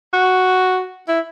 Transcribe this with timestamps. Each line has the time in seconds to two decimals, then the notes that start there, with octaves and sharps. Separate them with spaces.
0.13 F#4
1.08 E4